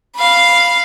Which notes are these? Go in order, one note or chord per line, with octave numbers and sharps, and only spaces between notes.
F5 B5